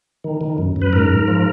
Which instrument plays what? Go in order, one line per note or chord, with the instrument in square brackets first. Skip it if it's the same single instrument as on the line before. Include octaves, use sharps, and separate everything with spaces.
[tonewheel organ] D#3
D#3
F#2
F#2
B4
G#2 A#4
G#2
F3